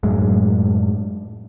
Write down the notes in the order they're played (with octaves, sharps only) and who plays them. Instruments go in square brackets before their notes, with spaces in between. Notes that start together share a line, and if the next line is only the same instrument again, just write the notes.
[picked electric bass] F#2 A2 G#3